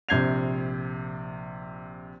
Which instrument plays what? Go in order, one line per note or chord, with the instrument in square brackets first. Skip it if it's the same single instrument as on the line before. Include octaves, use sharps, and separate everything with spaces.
[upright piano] A#1 C3 G6 G#6 C7 F7